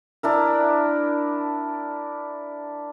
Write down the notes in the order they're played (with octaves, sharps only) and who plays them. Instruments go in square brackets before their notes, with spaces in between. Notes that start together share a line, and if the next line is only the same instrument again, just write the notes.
[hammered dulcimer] D4 E4 A#4